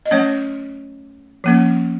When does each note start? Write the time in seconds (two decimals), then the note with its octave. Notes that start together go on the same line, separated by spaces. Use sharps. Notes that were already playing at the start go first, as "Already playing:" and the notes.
0.06 D#5
0.11 F#3 A3 C#4 C#5
1.44 F3 A#3 C#4